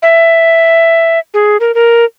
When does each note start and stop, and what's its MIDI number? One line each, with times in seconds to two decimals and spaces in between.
0.02 1.19 76
1.34 1.57 68
1.60 1.74 70
1.74 2.05 70